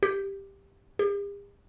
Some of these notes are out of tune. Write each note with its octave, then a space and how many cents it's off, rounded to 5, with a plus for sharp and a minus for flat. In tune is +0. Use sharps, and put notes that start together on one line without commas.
G4 +5
G4 +45